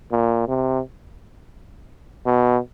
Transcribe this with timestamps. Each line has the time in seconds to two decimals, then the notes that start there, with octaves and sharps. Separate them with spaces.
0.12 A#2
0.48 C3
2.26 B2